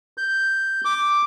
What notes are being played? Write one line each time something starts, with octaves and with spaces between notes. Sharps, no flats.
G6
D6